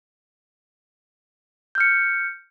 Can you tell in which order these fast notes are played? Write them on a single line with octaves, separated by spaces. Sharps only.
G6 F6 C#7